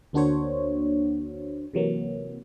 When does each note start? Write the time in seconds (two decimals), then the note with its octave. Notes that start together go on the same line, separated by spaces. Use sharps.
0.13 D2 A#3 D4 F#4 C5 C#5
1.73 C3 E3 F#3 A#3